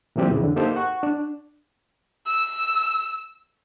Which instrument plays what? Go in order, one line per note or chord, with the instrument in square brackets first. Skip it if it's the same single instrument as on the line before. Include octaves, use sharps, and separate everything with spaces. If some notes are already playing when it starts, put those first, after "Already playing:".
[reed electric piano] A#2 E3 F#3 C4 G4 D5
F2 C#3 E3
D3
A#3 D#4 G4 A4 C5
F#5 C#6
D4
[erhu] E6